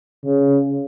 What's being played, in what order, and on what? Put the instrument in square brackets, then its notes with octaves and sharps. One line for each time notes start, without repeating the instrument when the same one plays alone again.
[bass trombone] C#3